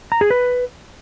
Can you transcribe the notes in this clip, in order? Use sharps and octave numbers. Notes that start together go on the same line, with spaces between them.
A#5
G#4
B4